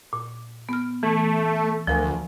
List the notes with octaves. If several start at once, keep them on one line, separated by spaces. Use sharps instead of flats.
A#2
B3 F6
E3 A3
D2 F3 A#4 G#5